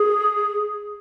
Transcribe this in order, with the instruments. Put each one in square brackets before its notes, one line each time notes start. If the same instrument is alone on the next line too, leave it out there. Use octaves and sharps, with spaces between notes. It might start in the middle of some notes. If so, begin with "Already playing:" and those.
Already playing: [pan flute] G#4